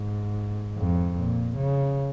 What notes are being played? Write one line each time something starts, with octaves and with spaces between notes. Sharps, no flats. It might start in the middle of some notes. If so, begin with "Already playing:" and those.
Already playing: G#2
F2
A#2
C#3